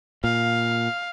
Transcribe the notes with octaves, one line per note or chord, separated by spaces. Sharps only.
A#2 F5